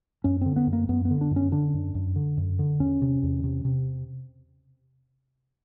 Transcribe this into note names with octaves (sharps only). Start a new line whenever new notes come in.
F#2 C#4
D3 C4
B3
F#2
A#3
F#2 B3
B3
D3
D4
F#2
C#4
D3 D4
F#2
F#2
D3
F#2
D3
E2 C#4
C3
E2
C3
C3